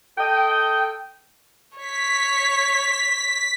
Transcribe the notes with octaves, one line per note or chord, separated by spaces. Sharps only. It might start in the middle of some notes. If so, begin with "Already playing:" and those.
A4 D#5 G5
C#5 B6